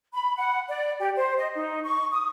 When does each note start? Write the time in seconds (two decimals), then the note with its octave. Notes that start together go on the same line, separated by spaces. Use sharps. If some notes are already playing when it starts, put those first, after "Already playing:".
0.14 B5
0.37 F#5
0.68 D5
0.99 G4
1.16 C5
1.38 D#5
1.54 D#4
1.84 C#6
2.12 D#6